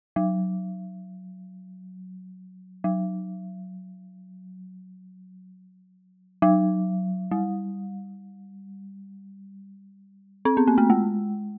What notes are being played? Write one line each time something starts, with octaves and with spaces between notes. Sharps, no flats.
F#3
F#3
F#3
G3
C4
B3
A#3
A3
G#3